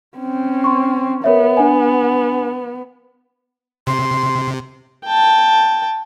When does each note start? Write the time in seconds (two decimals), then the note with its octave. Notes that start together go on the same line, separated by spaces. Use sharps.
0.18 C4 C#4
0.64 C6 C#6
1.24 B3 A#4 C#5 E5
1.57 D4 F#5 G#5
3.87 C3 C6
5.04 G5 A5